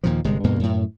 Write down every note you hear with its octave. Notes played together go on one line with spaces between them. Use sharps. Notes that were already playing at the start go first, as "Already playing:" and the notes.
D#2 A#2 F3
G1 C3 G#3
D2 G2 B2 A#3
F#2 A2